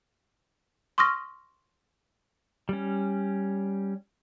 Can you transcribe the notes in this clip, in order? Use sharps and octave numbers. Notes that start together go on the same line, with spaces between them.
C6 C#6 D#6 F6 A#6
G3 C#4